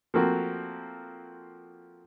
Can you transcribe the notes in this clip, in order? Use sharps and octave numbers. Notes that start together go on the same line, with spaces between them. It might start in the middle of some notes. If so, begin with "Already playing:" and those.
F3 A3 A#3 C4 F#4